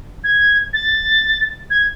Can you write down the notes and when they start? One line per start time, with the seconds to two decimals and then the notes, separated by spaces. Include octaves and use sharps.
0.24 G#6
0.73 A6
1.70 G#6